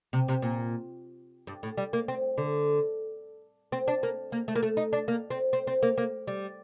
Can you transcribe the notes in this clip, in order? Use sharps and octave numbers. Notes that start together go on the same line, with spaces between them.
C3
C3
A#2
G2
A2
G3
A#3
C4
D3
C4
D4
A#3
A#3
A3
A#3
A3
D#4
D4
A#3
C4
C4
C4
A#3
A#3
G3